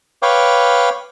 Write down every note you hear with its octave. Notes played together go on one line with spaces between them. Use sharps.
B4 C#5 F5 G5 D6